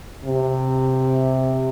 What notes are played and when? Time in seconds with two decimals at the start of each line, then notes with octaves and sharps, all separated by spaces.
0.25 C3